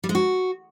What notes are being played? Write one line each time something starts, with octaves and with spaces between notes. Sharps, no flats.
G3
G#3
F#4